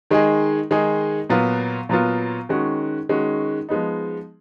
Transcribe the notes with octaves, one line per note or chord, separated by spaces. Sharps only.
D#3 G#3 D#4 G#4
D#3 G#3 D#4 G#4
A#2 F#3 B3 F4
A#2 F#3 B3 F4
D#3 G#3 C#4 F#4
D#3 G#3 C#4 F#4
F3 G#3 B3 D#4